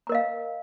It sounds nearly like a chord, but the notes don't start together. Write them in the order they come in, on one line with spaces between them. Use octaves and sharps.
A#5 A#4 D#5 F5